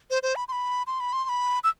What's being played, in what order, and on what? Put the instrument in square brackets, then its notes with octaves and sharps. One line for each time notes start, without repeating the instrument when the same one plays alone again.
[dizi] C5
C5
B5
C6
B5
C6
B5
C6
C6
B5
E6